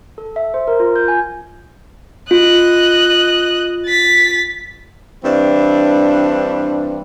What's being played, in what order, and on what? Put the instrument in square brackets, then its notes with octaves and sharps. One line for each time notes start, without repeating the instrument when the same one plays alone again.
[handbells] A4
E5
C5
A#4
F4
G6
G#5
[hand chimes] F4 [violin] D#5 F#6
[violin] A6 B6
[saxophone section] G2 E3 C4 D4